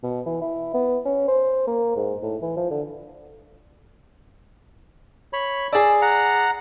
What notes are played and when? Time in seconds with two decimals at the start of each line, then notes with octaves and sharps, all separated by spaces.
0.03 B2
0.26 E3
0.42 E4
0.74 B3
1.05 C#4
1.28 C5
1.67 A#3
1.96 G#2
2.23 A2
2.42 E3
2.57 F3
2.70 D3
5.33 C#5 B5
5.73 G#4 D5 E6
6.02 F#5 A#5